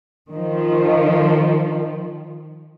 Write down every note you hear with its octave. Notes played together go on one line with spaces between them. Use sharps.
D#3 F3